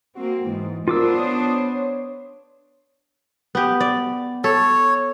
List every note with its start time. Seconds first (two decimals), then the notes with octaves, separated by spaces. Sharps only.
0.15 A#3 C4 F#4
0.46 G#2 E3
0.88 B3 D4 F4 A#4 C5 D6 E6
1.18 C#5 D#6
1.55 C#5
3.55 B3 G4
3.80 D5
4.44 A4 C#5